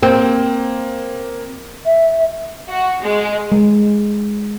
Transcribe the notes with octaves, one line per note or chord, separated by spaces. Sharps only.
A#3 C4
E5
F#4
G#3
G#3